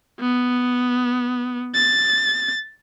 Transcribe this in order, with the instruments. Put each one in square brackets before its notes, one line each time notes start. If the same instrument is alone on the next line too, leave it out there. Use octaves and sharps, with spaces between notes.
[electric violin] B3
A6